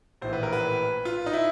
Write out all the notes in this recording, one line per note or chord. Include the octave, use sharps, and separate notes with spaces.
A#1 A2 E3 C5
B4
A#4
B4
F4
D#4
E4